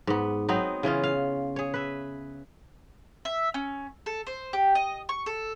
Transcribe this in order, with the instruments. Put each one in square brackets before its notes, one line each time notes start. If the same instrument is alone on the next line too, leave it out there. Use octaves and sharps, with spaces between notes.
[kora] G#2 B3
F#3 B3 C4 D#4
C#3 E3 C#4 F4
F5
G#4 C#5
B4 E5
[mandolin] E5
C#4
A4
C5
G4
D#5
C#6
A4